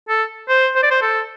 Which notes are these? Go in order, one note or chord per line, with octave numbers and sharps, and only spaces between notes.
A4
C5
C5
D5
C5
A4